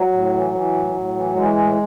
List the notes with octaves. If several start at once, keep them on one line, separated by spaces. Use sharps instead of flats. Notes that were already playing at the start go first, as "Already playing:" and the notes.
Already playing: F#3
A2
E3
E3
A2
A2
E3
E3 G#3
A2